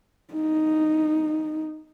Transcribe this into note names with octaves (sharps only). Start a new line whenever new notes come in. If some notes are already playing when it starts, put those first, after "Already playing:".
D#4